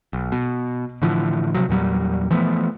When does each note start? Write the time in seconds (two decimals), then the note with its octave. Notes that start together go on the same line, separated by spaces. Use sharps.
0.13 B1
0.32 B2
1.02 A2 D3 E3 F3
1.55 C3 F3 F#3
1.69 E2 A#2 F#3 G3
2.31 E3 F3 A3 B3